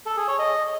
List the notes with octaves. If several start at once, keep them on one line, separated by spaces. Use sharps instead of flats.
A4
G#4
C#5
D#5